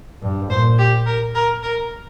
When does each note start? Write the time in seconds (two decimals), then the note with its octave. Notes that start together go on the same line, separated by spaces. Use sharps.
0.22 G2
0.50 A#2 C5
0.79 G4
1.07 A#4
1.35 A#4
1.63 A#4